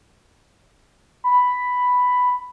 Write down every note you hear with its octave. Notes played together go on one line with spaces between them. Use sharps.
B5